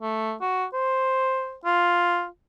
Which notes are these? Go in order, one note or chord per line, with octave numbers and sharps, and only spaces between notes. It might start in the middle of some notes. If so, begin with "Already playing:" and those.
A3
F#4
C5
F4